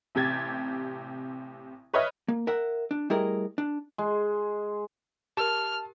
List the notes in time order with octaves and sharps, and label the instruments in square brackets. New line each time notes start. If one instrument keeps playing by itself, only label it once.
[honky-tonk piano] A1 C3 G4 G#6 A6
B4 C#5 D#5 E5 F6
[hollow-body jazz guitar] A#3
A#4 E5 F#5
D4
G3 A3 E4 G#4 A#4 D#5
D4
[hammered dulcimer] G#3
[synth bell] G4 A#4 [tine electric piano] A5 [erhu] F6